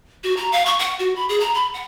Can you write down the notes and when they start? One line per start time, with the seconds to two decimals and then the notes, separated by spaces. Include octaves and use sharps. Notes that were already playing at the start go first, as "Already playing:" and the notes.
0.24 F#4
0.37 A#5
0.52 F5
0.66 C#6
0.79 F#5
0.99 F#4
1.16 B5
1.29 G#4
1.40 A#5
1.54 B5
1.74 F#5